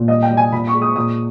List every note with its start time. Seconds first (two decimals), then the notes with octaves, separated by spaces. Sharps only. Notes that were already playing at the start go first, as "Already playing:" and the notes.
Already playing: A#2
0.08 G3 D#5
0.23 G5
0.30 G3
0.37 G#5
0.52 A#2 B5
0.67 C#6
0.75 G#3
0.82 D#6
0.96 A#2 D#6